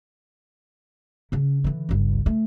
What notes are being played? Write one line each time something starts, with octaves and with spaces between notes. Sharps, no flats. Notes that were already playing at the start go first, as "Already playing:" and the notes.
C#3 C#4
D3 E3
G1 C#2
A3